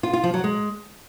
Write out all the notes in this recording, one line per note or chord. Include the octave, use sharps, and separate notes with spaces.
F4
F4
F3
F#3
G#3